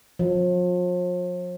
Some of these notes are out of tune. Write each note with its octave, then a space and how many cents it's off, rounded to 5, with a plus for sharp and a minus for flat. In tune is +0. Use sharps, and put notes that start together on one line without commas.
F3 +40